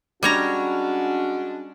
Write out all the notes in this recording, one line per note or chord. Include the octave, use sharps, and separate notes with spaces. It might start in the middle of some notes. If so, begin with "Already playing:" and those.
G3 G#3 C#4 D4 F#4 C#5 A#5